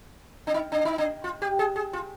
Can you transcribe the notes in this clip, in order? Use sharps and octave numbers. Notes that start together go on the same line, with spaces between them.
D4
D#4
D4
D#4
D4
F4
G4
G#4
G#4
F4